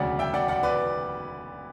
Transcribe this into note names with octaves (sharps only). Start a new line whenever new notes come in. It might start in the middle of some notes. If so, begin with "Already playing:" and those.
Already playing: E1 D2 C#3 F#3 D5 F#5
E5 G5
D5 F#5
D5 F#5
B4 D5